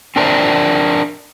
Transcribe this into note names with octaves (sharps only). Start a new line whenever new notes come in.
C4 D4 A#4 C5 D5 E5